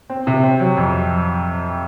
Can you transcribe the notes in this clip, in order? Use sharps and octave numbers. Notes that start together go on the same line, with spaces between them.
C4
C3
C4
F#3
F2